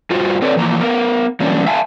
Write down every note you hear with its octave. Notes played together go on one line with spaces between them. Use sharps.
G2 F4 F#4 C5
C4 A4 B4 C#5 D5
E3 F3 A#3 A#5
B3 A#4
E3 F#3 G3 A#3 C#4 D4
E5 F5 G#5 A5